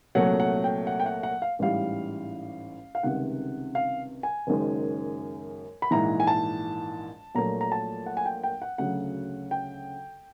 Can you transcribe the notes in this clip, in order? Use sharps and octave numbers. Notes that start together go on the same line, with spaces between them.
C2 A#2 F#3 A3 F#5
F#5
G5
F#5
G5
F#5
F#5
F5
A1 G#2 E3 G3 F5
F5
C#2 C3 D#3 G3 F#5
F5
G#5
F#1 F#2 D#3 G#3
B5
A#1 G#2 E3 A#5
G#5
A5
A#1 A#2 F#3 A3 A#5
A#5
A5
F#5
G#5
G5
G5
F#5
D2 C#3 F#3 F#5
G5